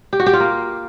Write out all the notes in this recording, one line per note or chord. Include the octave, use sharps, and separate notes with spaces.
G4
F#4
G4
F4
A#3